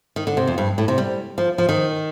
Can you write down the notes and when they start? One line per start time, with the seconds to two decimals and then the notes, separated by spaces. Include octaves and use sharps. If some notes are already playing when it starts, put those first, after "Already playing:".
0.16 D#3
0.27 D3
0.37 C3
0.47 F2
0.58 G2
0.78 A2
0.88 C3
0.98 G3
1.38 F3
1.58 F3
1.69 D#3